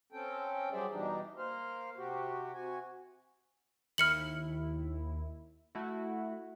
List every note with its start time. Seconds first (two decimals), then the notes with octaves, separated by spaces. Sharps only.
0.12 C4 C#4 A4 G5
0.72 F#3 G3 G#4 C5 D5 E5
0.91 B2 E3 G3 D4 D#4
1.37 A#3 C5 F5
1.97 C3 F#4 G4
2.54 C3 F#4 G#5
3.98 D#2 E4 F6 C#7 F#7
5.75 A3 E4 F#4